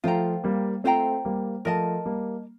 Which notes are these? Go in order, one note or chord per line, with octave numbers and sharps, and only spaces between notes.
F3 A3 F4 C5 G5 A#5
G3 A#3
A3 C4 F4 C5 G5 A#5
G3 A#3
F3 A3 A#4 D#5 A5
G3 A#3